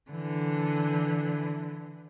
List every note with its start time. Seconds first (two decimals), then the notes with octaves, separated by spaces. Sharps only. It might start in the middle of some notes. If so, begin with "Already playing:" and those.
0.11 D3 E3